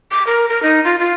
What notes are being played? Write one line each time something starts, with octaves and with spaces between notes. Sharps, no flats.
D6
A#4
A#4
D#4
F4
F4